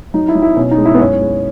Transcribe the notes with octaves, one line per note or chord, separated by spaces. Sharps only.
F#3 D#4
E4
F#3
E4
B2 C#4
D#4
G#3
E4
B3
F#2 C#4
G#3